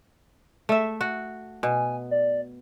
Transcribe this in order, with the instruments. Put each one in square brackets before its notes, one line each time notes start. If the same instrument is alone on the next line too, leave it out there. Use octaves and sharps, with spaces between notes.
[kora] A3 E5
F#4
[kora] B2 [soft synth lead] G#5
[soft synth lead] D5